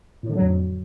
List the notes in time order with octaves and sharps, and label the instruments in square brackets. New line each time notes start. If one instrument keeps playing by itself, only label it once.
[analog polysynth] A2
D3
F#3
F2